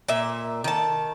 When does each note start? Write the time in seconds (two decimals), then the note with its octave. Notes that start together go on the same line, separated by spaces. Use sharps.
0.08 A#2 E5
0.64 D#3 A5